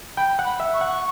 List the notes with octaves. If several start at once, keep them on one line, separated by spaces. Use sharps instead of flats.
G5 B5
F#5
B5
E5
C#6
F#5